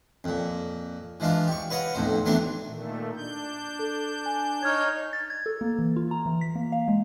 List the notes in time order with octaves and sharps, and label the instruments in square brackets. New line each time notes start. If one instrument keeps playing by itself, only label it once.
[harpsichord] F2 A#2
E3 F3 G#3 D4 F4
G4 C#6
B4 C#5 D#5 F5 F#5
B1 F2 A2 C5
E3 F#3 A3 B3 C4 D4
[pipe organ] A#2 D#3 A3
D4 G6
[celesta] A4
G#5
[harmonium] D#4 C#5 [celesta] F6 G#6
[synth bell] A6
G#6
A4
A#3
E3
F4
A#5
E3
B6
A#3
F5
G#3